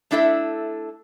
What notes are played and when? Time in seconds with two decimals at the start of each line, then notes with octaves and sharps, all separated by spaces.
0.11 A3 D4 E4 A4 E5